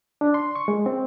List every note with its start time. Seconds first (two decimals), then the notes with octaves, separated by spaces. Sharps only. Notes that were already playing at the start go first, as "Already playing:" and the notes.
0.21 D4
0.34 C6
0.55 C#6
0.68 G#3
0.86 C4